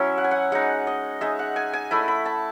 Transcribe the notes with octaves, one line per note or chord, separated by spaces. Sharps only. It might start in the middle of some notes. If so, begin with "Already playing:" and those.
Already playing: F#3 C#4 E4
F#5
G#5
F#5
G#3 D#4 F#5
D#5
G#3 D#4 E5
F#5
G#5
G#5
A3 E4 B5
B5
A5